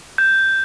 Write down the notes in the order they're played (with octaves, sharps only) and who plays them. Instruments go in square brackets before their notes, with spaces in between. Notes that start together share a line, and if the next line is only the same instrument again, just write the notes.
[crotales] G6